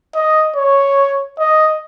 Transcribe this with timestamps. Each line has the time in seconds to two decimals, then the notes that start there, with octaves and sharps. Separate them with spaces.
0.15 D#5
0.56 C#5
1.39 D#5